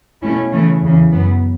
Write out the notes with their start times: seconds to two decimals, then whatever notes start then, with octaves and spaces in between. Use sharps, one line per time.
0.21 B2 A3 C#4 E4
0.51 C#3 E3 A3 C#4
0.82 E2 C#3 E3
1.12 F#2 F#3 B3